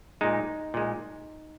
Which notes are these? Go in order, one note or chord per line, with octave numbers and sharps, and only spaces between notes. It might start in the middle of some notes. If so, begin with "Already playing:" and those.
A#2 G#3 D#4
A#2 G#3